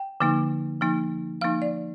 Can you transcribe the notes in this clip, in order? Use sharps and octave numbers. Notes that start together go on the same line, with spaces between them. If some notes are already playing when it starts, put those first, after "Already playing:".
Already playing: G5
D3 F3 A#3 D#4
F3 A#3 D#4
F3 A#3 D#4 F5
D5